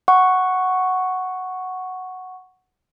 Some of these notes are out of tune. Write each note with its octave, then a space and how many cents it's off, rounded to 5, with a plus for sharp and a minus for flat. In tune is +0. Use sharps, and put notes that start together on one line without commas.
F#5 +0 C#6 +0